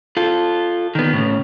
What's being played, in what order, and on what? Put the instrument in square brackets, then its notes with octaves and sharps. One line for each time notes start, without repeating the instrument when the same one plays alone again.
[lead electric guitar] F4 A4
D#3 B3
A2 C#3